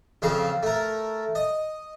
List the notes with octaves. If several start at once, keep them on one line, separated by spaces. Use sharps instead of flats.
F2 C#3 C4 F5
A3 A#4
D#5